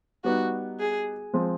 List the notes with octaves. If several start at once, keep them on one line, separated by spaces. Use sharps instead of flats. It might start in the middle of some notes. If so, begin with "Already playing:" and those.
G3 B3 D#4 F#4
G#4
F3 G#3 C4